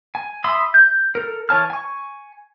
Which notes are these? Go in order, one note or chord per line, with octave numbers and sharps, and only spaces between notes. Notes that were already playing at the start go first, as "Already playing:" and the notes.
G#5
E5 B5 C6 D#6 E6
G6
A4 A#4
E3 C#5 A5 F6
G#5 C#6